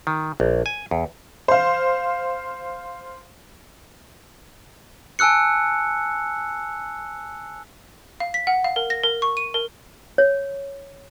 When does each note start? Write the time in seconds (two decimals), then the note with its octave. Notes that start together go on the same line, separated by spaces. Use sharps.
0.07 D#3
0.40 A#1
0.66 G#5
0.91 E2
1.48 C5 F5
5.19 G#5 A5 E6 F#6 C#7
8.20 F5
8.34 B6
8.47 F#5
8.64 F5
8.76 A#4
8.90 A#6
9.03 A#4
9.22 C#6
9.37 D#7
9.54 A#4
10.18 C#5